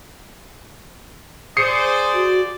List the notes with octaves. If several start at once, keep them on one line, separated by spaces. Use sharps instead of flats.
G#4 C5 D5 D#6 C7 C#7
F#4